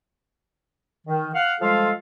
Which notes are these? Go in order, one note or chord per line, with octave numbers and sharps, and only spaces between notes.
D#3
F5 F#5
F3 G3 G#3 F4 A4 F5